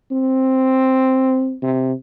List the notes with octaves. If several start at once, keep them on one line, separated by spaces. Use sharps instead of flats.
C4
C3